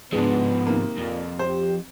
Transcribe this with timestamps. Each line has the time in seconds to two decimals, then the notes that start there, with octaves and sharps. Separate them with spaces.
0.12 G#2 F3 G#3 B3 D4
0.67 C3 D#3 A#3
0.98 F2 A#2
1.39 G4 C5